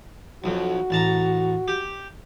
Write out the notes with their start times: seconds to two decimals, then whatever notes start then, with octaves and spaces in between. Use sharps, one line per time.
0.44 B1 F2 F#4
0.90 A1 A5 A#5
1.68 G4